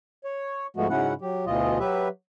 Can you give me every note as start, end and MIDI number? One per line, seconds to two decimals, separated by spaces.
0.24 0.67 73
0.76 0.87 44
0.76 0.87 53
0.76 0.87 56
0.76 0.87 57
0.76 0.87 59
0.76 0.87 66
0.90 1.13 44
0.90 1.13 49
0.90 1.13 54
0.90 1.13 61
0.90 1.13 64
0.90 1.13 78
1.21 1.45 54
1.21 1.45 67
1.46 1.78 38
1.46 1.78 47
1.46 1.78 52
1.46 1.78 65
1.46 1.78 75
1.79 2.08 54
1.79 2.08 67
1.79 2.08 71
1.79 2.08 76